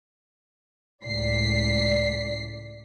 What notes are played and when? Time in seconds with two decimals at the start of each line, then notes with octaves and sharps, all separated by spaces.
1.03 C#2 A2 D5 B6 C7